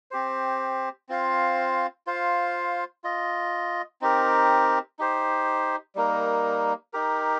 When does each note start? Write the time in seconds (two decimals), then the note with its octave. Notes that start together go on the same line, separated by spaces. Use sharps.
0.11 C4 G4 C5
1.09 C4 F4 C5 F5
2.07 F4 C5 F5
3.04 F4 D#5
4.01 C4 D#4 G4 A#4
4.99 D#4 G4 C5
5.95 G3 A#3 D#4 A#4
6.93 D#4 G4 A#4